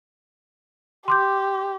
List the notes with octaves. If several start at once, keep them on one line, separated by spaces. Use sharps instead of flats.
G4 C6 D6 G6